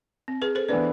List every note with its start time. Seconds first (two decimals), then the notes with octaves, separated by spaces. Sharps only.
0.28 C4
0.42 G#4 B4
0.55 A4 C5
0.69 E3 B3 D4 B4 D5